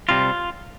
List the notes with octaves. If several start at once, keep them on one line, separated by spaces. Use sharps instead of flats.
C3 G3 C4 F4